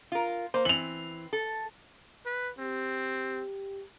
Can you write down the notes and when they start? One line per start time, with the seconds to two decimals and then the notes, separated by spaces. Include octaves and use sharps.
0.12 F4 A#4
0.54 A#3 C5
0.65 E3 C4 F7 F#7
1.33 A4
2.26 B4
2.58 C4 G4